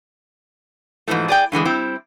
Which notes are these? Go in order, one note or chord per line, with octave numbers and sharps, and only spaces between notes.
G#2 B2 E3 F3 A3
G#4 D5 G5
G2 D3 E3 G#3
G3 C4 E4